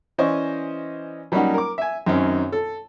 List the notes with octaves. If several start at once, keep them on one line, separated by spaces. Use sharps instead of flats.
E3 C#4 C5 D5 D#5 C#6
F#3 G3 A#3 C#4 D#4 F#5
A#4 D6
E5 G#5
F#2 D#3 C4 C#4 D#4
A4